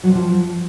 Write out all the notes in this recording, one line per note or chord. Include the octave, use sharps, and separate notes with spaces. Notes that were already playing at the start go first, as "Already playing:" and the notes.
F#3
C3
F3